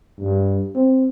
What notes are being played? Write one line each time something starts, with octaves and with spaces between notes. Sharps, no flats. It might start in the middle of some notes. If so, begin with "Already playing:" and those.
G2
C4